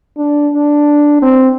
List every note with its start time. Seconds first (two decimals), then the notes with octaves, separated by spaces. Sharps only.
0.17 D4
0.54 D4
1.22 C4